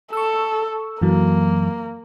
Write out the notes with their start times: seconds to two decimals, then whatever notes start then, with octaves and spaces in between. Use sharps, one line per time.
0.13 A4 C#6 E6
1.02 F#2 E3 F#3 A#3